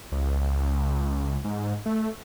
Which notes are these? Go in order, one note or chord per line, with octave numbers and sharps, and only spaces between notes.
C#2
G#2
A3